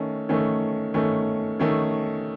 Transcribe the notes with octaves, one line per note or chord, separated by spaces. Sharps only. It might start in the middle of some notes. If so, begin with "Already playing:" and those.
Already playing: D#3 A3 C#4
D#3 A3 C#4
D#3 A3 C#4
D#3 A3 C#4